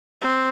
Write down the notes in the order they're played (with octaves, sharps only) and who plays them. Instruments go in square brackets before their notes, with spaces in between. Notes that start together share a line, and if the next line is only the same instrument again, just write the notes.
[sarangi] C4